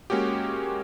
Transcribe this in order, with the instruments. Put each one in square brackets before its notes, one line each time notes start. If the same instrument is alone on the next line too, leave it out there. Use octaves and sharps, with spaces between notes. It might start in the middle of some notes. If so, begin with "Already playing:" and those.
[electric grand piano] G#3 A#3 C#4 F#4 G4